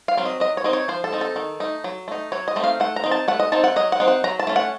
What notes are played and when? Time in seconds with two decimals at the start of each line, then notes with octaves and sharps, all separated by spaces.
0.08 F5
0.17 F#3 C4
0.25 D#5
0.40 F#3 D#5
0.57 C#5
0.64 C4 D#4 D#5
0.73 C#5
0.88 F3 C5
1.04 A4
1.12 C4 D#4
1.21 A4
1.36 D#3
1.60 A3 D#4
1.84 F#3
2.08 A3 D#4
2.32 F#3 C#5
2.48 D#5
2.56 A3 C4 D#4
2.64 F5
2.80 A3 F#5
2.96 A#5
3.04 C4 D#4
3.11 A5
3.28 A3 F#5
3.40 D#5
3.52 C4 D#4 A5
3.64 F#5
3.76 F#3 D#5
3.92 F#5
4.00 C4 D#4
4.08 F#5
4.24 F#3 A#5
4.39 A5
4.47 A3 C#4
4.56 F#5